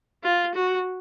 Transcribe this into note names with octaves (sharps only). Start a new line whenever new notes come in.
F4
F#4